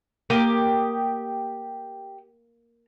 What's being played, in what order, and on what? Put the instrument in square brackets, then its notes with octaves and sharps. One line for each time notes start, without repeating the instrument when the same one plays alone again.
[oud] A#3 [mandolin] G4 D#6